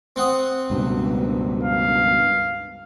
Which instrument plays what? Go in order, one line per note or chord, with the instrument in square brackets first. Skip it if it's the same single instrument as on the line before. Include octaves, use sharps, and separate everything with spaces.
[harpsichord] C4 F#5 D#6
[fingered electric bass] C#2 G2 B2
[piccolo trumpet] F5